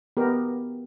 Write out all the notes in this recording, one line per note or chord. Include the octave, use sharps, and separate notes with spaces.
B3 G4 A#4